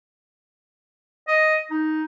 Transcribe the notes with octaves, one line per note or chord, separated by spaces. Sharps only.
D#5
D#4